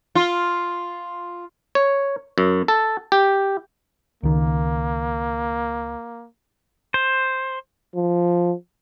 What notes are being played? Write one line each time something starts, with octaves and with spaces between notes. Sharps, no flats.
F4
C#5
F#2
A4
G4
C#2 D#3 A#3
C5
F3